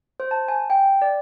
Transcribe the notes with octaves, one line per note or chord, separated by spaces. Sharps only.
C5
A5
G#5
G5
D5